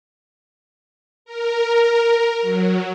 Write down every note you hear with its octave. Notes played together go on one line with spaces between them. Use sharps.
A#4
F#3